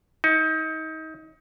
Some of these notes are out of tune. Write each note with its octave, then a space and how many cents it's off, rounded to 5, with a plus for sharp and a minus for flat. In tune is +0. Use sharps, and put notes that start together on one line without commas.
D#4 +30